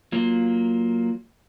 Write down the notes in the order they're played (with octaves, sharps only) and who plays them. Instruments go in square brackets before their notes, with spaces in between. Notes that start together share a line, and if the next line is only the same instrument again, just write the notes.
[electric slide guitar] F#3 A#3 F4